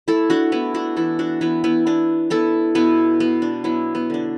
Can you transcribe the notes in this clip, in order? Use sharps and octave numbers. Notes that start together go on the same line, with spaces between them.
A3 E4 A4
D4 F#4
A3 B3 E4
D4 F#4
E3 E4 A4
D4 F#4
E3 B3 E4
B3 E4
B3 D4
B3 E4 A4
B2 B3 E4
B2 B3
D4
F#3 B3 E4
B3
D3 D4